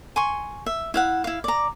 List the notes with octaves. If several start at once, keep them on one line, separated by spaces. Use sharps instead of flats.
G#5 C6 C#6
E5
E4 F5 F#5
E4 F5
D5 A#5